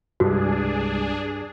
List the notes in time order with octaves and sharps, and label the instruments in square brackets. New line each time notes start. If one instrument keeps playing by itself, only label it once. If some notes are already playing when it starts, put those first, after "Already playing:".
[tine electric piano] C2 G3 G#3 [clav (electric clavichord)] G2 [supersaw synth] D4 G#4 [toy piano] F#4